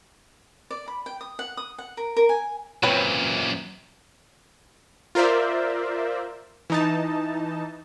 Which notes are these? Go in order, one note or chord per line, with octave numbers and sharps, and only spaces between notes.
D5
B5
G5
D#6
F#5
D#6
F#5
A#4
A#4
G#5
F#2 A#2 C4 B4 C#5
F4 A#4 C5 D5 E5
E3 D#4 A5